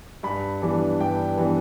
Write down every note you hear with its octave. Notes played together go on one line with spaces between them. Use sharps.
G2 B5
E3 G3 B3 D4
G2 G5
E3 G3 B3 D4